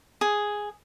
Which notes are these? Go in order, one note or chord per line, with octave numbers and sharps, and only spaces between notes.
G#4